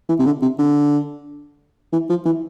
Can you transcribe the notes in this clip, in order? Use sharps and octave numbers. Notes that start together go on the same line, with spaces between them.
E3
C3
D3
C3
D3
E3
F3
E3